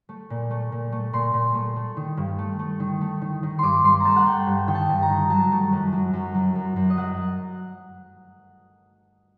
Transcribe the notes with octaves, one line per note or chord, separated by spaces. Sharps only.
A3
A#2
A3
A#2
A3
A#2 C6
A#2
A3
A3
D#3
G2
A3
A3
D#3
A3
D#3
D#3
G2 C6 D6
G2 C6
A3 A5 A#5
F#5
A3 G5
G2
D#3 G5
A5
G2
A#5
D#3
F#3 A5
A3
F#2
F#3
F#2
F#3
F#2
F#2
D#5
F#3 F#5